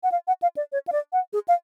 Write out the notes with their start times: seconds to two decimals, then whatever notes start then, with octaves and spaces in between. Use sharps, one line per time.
0.03 F#5
0.12 F5
0.27 F#5
0.42 F5
0.57 D5
0.72 C#5
0.87 F5
0.92 D5
1.13 F#5
1.33 G#4
1.48 F5